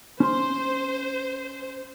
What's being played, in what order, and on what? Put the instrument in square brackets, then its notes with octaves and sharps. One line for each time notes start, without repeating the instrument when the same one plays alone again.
[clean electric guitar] C#4 C6 [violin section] C5